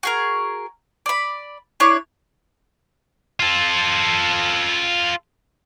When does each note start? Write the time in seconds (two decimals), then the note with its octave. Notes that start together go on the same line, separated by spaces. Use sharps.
0.03 F#4 G#4 A#4
1.06 D5 B5
1.80 D4 E4 C#5
3.40 F4 A4